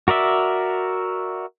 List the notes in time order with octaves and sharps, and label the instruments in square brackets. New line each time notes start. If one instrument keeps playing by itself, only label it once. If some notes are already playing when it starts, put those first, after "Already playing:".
[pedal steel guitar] F#4 A#4 D5 E5